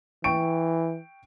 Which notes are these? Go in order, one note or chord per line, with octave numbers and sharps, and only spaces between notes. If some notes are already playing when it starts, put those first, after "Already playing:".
E3 G5 C#6 D7